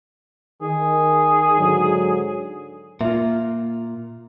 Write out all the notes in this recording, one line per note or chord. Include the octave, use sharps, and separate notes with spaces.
D#3 G#4
G#2 D3 F#3
A#2 A#3 F4 E5